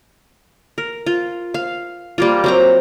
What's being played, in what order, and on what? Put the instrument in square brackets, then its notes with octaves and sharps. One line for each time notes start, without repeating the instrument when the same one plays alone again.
[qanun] A#4
F4
F5
G3 A#3 F4
F#3 C4 A#5